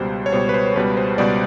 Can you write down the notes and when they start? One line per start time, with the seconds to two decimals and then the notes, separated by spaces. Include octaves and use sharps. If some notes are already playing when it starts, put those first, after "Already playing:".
Already playing: C#2 B2 G3 C5
0.26 C#5
0.32 C#2 B2 G3 C5
0.49 B4
0.54 C5
0.76 C#2 B2 G3 B4
0.97 C5
1.18 C#2 B2 G3 D5